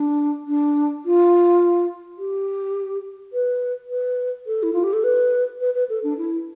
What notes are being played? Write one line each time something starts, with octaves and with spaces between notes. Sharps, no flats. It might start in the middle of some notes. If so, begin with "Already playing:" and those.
Already playing: D4
D4
F4
G4
B4
B4
A4
E4
F4
G4
A4
B4
B4
B4
A4
D4
E4